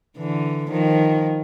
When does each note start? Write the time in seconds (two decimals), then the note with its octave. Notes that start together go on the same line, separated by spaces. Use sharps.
0.18 D3 E3
0.70 D#3 F3